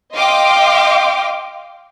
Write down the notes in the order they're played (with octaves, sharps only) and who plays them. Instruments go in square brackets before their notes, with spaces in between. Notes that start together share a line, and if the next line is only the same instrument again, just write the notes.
[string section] D#5 F5 G5 C6 D6